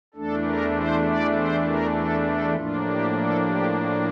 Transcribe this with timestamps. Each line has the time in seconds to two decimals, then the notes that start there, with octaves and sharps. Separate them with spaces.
0.14 E2 E3 A3 D4 A4
0.44 A#4
0.75 C5
1.05 D5
1.35 C5
1.65 A#4
1.95 A4
2.25 A4
2.55 A2 F3 A#3 D4 F4
2.85 G4
3.16 A4
3.45 G4
3.76 F4